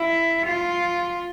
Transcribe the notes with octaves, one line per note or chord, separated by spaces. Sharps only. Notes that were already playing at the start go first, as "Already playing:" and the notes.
Already playing: E4
F4